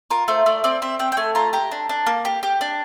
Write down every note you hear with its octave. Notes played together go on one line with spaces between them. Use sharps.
F4 A#4
A3 C5
A3 D5
C4 D5
C4 E5
C4 G5
G5
A3 G#5
F4 A#5
G4 A#5
D4
D4
A#3
G4
G4
D4